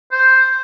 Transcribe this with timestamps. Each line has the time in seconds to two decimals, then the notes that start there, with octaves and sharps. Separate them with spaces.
0.12 C5